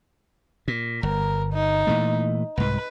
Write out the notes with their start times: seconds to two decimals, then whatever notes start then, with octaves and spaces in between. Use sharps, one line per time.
0.68 A#2
1.03 G1 A#4
1.53 D#4
1.87 A#2 E3 A3
2.57 C2 G#2 B4